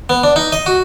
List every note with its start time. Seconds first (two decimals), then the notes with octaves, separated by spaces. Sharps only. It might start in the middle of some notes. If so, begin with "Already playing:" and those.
0.10 B3
0.23 D4
0.36 D#4
0.52 D#5
0.66 F#4